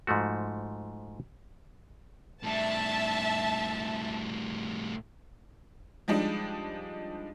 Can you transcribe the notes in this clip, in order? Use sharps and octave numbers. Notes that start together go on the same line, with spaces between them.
G#2 F3 A3 F#4
A2 G3 E5 A5
F3 G3 G#3 D4 D#4